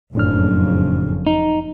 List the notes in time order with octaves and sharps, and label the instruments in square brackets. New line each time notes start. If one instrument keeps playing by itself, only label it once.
[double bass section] F#1 F2 C#3 [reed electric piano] A2 D4 F6
[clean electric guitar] D#4